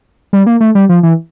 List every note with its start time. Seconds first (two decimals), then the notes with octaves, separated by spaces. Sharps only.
0.33 G3
0.46 A#3
0.60 A3
0.75 G3
0.89 F3
1.03 E3